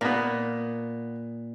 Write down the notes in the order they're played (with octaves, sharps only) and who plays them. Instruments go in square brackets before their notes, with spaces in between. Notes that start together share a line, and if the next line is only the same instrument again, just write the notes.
[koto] A#2 [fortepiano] A#3 B3